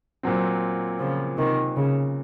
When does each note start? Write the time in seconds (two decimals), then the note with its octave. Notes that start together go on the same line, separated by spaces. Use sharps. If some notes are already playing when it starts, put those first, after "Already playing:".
0.23 A#2 F#3 C4
0.99 C#3 F3
1.37 C3 D#3
1.75 C#3